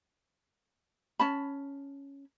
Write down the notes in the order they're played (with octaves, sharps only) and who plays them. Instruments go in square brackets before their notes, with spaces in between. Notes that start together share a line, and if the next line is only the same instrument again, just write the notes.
[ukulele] C#4 A5 B5